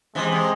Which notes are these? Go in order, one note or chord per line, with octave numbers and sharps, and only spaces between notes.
C3 E3 G#3
C3